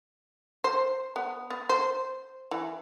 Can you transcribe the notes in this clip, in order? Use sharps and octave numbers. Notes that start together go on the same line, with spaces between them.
C5
B3
B3
C5
E3